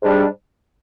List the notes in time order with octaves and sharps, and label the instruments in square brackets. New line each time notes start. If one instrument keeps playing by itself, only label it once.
[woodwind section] G#2 G3 D4